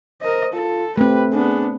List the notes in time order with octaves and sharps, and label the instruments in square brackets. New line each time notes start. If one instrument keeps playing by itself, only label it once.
[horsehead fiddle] A#4 D#5 [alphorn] C5
[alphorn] F4 [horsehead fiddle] A4
[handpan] A3 C4 [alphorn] G4 [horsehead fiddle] B4
[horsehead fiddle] B3 D4 [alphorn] G#4